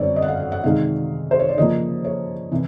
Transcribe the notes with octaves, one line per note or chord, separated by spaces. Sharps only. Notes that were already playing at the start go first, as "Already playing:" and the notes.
Already playing: F#2 D3 G3 C4 C#5 D5
D#5
F#5
F5
F#5
F#5
C3 D#3 G#3 F5
C5
C#5
D5
C#3 F3 A#3 D#5
C#5
C3 E3